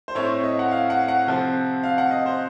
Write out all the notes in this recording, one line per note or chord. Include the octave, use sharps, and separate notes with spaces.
C5
A2 A3 C4 C#5
D#5
F#5
F5
F#5
F#5
C3 F3 C4
F5
F#5
D#5
C5